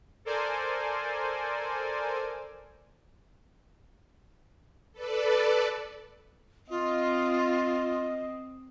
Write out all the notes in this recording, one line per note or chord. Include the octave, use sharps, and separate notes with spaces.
A4 A#4 C5 D5 G#5
A4 B4 D5
C4 F4 D#5